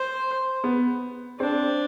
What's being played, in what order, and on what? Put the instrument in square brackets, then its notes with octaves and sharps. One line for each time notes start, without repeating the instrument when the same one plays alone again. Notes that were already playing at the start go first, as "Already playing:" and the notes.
Already playing: [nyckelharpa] C5
[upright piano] B3
[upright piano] C4 [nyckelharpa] D4